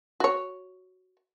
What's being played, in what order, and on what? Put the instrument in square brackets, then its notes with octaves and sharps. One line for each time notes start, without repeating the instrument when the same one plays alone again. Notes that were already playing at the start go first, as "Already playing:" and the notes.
[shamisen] F#4 C#5